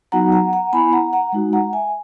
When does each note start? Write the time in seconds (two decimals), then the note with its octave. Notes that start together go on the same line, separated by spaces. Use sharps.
0.12 F#3 B3 D#4 F#4 F#5 A#5
0.32 F#5 A#5
0.53 F#5 A#5
0.73 B3 E4 G#5 B5
0.93 F#5 A#5
1.13 F#5 A#5
1.33 G#3 D#4 F#4
1.53 F#5 A#5
1.73 E5 G#5